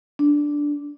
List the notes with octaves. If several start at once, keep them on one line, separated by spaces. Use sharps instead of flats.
D4